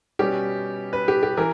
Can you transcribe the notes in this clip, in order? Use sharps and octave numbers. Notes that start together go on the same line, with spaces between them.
B2 G3 C#4 G4
B4
G4
G4
E3 A#4